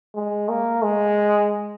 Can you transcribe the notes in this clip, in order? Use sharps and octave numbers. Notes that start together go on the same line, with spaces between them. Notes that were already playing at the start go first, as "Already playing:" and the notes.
G#3
A#3
G#3